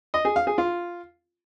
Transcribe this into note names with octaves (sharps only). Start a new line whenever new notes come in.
D#5
G#4
F5
G#4
F4